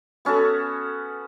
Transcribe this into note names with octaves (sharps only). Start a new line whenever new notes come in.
B3 C#4 F#4 A4